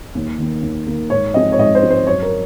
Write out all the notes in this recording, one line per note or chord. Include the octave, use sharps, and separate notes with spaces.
D#2
D#3 A#3
D#2
D#3 A#3
G#2 C#5
F3 G#3 C4 D#5
C#5
G#2 D#5
C5
F3 G#3 C4
C5
F#2 C#5
A#4